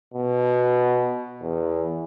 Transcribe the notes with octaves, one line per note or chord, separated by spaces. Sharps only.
B2
E2